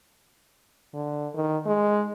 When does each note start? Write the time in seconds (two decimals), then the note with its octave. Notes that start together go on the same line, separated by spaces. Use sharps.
0.94 D3
1.35 D#3
1.66 G#3